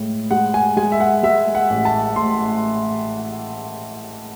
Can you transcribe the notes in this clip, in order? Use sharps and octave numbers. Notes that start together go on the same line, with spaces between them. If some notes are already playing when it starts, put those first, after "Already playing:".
Already playing: A2 G#3
G#3 F#5
G#5
G#3 G#5
E5
F#5
G#3 E5
F#5
A1
A5
A2 C6